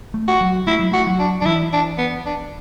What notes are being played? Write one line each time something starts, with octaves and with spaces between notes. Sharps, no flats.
A3
F#4
F#3
A3 E4
F#3
A3 F#4
F#3
D4
F#3 D4
E3 E4
D4
B3
D4